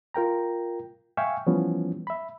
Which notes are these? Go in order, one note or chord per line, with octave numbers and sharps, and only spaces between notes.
F4 A#4 G5 A#5
E5 F5 G5 G#5 C#6 E6
E3 F3 G3 B3 C#4
E5 B5